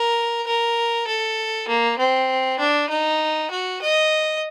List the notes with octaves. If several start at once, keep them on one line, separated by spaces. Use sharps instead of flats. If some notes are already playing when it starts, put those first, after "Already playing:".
Already playing: A#4
A#4
A4
A#3
C4
D4
D#4
F#4
D#5